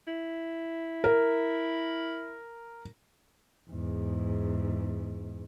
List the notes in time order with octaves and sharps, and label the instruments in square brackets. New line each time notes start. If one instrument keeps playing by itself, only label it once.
[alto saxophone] E4
[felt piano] A#4
[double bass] E2 G#2